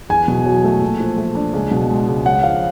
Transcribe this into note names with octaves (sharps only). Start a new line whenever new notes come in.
E2 G#5
B2
F#3
A3
A#2
F3
A3
D4
C#2
B2
G#3
C#2
C#3 F#5
F3 F5